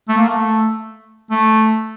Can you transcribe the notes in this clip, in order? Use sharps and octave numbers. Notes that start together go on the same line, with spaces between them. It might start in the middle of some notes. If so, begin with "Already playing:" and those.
A3
A#3
A3
A3